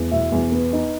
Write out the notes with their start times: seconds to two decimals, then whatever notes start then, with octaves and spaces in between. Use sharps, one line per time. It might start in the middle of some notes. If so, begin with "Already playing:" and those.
Already playing: E2
0.11 B2 E4 E5
0.32 E2
0.52 B3
0.73 D#4